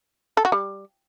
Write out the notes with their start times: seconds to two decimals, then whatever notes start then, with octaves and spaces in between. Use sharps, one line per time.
0.37 A4
0.45 F#4
0.52 G3